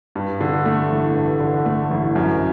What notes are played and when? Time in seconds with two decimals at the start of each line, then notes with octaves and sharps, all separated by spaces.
0.15 G2
0.41 D3
0.66 A3
0.90 A1
1.16 G2
1.40 D3
1.66 A3
1.91 A1
2.16 F#2